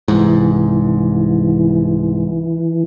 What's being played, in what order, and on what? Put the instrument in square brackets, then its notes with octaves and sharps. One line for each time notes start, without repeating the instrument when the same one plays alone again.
[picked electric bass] C2 G#2 [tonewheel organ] E3